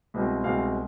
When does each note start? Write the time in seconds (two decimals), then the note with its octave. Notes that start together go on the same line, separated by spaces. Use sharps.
0.14 C2 B2 G#3 C4
0.43 C2 B2 G#3 C4 F5